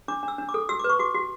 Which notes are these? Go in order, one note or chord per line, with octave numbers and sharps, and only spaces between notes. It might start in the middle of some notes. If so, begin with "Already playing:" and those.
D4 D6
D4
E6
D4
D6
A4
F#4 E6
B4 D6
C#6
F#4 D6
F#4